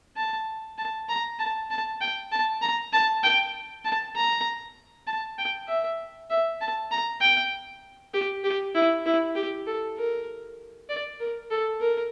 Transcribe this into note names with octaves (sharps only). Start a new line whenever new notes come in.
A5
A5
A#5
A5
A5
G5
A5
A#5
A5
G5
A5
A#5
A5
G5
E5
E5
A5
A#5
G5
G4
G4
E4
E4
G4
A4
A#4
D5
A#4
A4
A#4